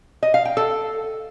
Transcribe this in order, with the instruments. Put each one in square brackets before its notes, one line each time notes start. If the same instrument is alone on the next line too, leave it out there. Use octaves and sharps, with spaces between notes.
[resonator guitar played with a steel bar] D#5
F5
G5
A4